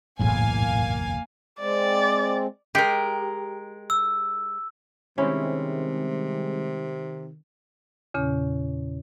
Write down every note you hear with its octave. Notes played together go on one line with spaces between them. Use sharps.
F#1 B1 E2 A2 A#3 F5 G#5
G#3 C4 D5
G#3 G4 A#4
E6
C3 D#3 G3 G#3 C4 C#4 E4
E2 A#2 C#3 C#4